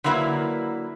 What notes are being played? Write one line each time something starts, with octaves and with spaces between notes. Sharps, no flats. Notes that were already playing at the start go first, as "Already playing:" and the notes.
D3 F#3 A#3 E4 B4